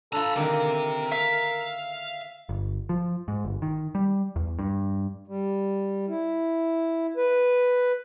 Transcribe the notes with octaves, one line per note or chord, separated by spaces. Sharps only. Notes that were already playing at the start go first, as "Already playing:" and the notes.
D4 F4 A4 A#5 B5
D3 D#3 A#3 C4 G4 A#4
E5 F5
G1
F3
G#2
G1
D#3
G3
E2
G2
G3
E4
B4